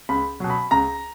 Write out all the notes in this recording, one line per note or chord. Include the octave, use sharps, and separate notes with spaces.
C#2 B5
B2 F#3
B5
C#2 A#5